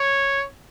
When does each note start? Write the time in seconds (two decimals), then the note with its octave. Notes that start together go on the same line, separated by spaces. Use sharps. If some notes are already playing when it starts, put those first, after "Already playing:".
Already playing: C#5